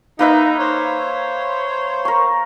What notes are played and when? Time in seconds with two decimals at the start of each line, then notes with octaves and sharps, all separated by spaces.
0.19 A#3 D#4 B4 E5
0.58 C5 C#5
2.05 A#4 C#6